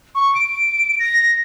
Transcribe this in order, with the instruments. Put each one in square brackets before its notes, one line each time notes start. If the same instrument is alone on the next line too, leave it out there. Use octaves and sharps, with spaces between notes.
[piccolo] C#6
D7
A#6